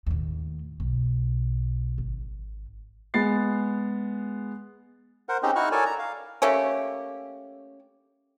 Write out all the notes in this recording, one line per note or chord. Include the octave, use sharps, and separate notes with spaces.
D#2 A2
B1
G#1
G#3 B3 A6 C7
A#4 C5 F#5
C4 C#4 D#4 G4 G#4 D#5
D#4 E4 F#4 C#6 F6 F#6
A4 A#4 C#5 D5 G#5 A5
A#5
F5
A3 A#3 C#4 G4